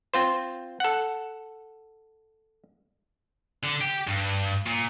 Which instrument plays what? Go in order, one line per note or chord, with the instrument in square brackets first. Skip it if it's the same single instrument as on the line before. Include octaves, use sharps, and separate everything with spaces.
[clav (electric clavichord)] C4 F4 C5
A4 F#5
[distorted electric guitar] D3
G4
G2
A#2